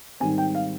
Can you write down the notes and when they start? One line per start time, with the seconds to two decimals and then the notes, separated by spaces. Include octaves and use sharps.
0.20 G#2 D#3 G3 C4 G#5
0.38 G5
0.55 F5